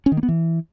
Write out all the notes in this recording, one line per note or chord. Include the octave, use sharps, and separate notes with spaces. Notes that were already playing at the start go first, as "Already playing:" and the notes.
C#4
D#3
A#3
B3
E3